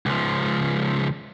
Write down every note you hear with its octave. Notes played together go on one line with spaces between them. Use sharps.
C#2 F3